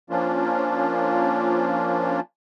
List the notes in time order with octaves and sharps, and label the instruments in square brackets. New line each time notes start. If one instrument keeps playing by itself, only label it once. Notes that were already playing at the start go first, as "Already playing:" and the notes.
[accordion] F3 A#3 C#4 D4 F4